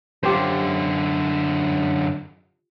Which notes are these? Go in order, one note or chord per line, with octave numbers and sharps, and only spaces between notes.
F#2 D3 F4 G4 C5